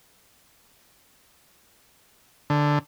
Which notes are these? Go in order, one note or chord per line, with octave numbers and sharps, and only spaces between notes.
D3